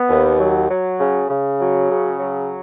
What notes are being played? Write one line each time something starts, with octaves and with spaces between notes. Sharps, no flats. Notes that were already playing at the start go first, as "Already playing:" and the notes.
Already playing: B3
D#2
F#3
F#3
C#3
C#3
F#3
C#3
F#3